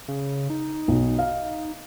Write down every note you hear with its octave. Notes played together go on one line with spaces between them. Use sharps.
C#3
D#4
B1
F5